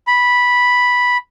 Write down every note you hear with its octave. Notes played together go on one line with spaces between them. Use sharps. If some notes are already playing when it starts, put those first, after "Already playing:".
B5